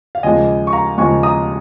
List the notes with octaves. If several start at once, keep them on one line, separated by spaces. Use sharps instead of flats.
F5
D#2 C#3 F3 G#3 D#5 G#5
C#6
F5 A#5
D#2 C#3 F3 G#3 G#5 C#6
A#5 D#6